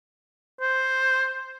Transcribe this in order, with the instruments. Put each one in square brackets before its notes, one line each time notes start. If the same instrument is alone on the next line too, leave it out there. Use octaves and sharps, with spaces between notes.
[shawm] C5